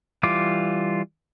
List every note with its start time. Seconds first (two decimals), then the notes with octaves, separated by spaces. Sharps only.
0.23 E3 G3 F4 D6